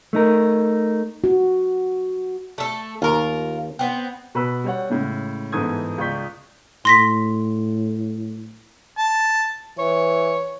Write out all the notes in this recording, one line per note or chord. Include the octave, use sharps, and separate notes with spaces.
A3 D#4 A#4
F#4
A3 A4
D#2 F4 A#4
B3 C4
B2 B4 B5 E6
G3 C#5 F#5
A2 C#3 G#3
G1 G#2 E3 A4 D#6 G#6
C#2 F4 D5 C#6 G6 B6
A2 C6 A#6 B6
A5
E3 C#5